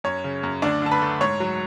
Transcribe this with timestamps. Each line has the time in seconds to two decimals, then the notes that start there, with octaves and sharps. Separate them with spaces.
0.04 F#2 C#5
0.24 C#3
0.43 F#2
0.62 D2 D4 D5
0.82 D3 A5
0.91 B4 B5
1.02 A3
1.21 G#2 C#5 C#6
1.40 F#3